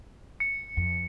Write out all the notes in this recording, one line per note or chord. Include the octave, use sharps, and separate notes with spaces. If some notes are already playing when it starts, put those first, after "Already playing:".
C#7
F2